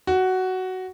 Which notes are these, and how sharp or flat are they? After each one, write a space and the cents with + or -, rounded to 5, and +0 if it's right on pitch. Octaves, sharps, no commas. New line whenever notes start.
F#4 +10